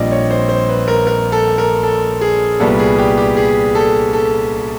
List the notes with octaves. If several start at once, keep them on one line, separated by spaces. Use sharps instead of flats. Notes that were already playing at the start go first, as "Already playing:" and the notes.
Already playing: A#1 A#2 G3 C4 D5 D#5
C#5
C5
C5
B4
A#4
A#4
A4
A#4
A4
G#4
C2 A#2 G3 B3 A4
G#4
G4
G4
G#4
A4
A4